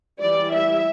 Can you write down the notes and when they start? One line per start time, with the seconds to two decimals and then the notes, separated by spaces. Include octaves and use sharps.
0.20 E3 G3 E4 D5
0.51 E5